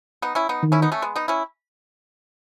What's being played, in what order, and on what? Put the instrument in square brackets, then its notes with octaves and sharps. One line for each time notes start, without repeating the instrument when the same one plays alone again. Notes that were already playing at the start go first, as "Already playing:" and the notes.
[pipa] B3 D#4
C#4 E4
B3 D#4
[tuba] D#3
[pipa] C#4 E4
B3 D#4
A3 C#4
G#3 B3
B3 D#4
C#4 E4